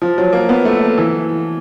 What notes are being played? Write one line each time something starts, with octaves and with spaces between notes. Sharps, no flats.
F3
F#3
A#3
B3
A3
E3